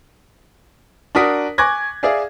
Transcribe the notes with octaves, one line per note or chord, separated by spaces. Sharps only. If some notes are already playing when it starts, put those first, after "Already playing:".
D4 F#4 A#4 D#6 B6
G#5 C#6 D6 F#6 G#6 A#6
G#4 D5 E5 F5 G#5